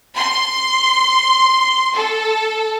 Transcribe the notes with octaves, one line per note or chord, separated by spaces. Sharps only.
C6
A4